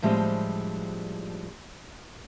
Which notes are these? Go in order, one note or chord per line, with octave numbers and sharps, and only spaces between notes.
A2 F3 G3 G#3 C4 D4